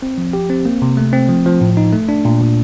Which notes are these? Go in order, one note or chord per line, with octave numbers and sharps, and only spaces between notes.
C4
F3
G4
C4
A#3
C3
A3
C4
F3
F3
A2
D#4
A3
D4
A#2
A#2